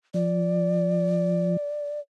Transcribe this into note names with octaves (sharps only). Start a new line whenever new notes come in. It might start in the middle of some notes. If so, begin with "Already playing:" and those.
F3 D5